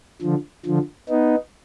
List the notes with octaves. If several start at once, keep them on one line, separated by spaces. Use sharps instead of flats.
D3 F3
D3 F3
B3 D#4